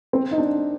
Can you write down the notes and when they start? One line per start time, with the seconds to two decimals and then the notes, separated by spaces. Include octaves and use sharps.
0.13 C4
0.31 D#4
0.38 D4